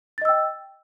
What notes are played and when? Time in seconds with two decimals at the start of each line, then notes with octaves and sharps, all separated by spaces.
0.18 A6
0.22 D#5
0.25 E6
0.29 G5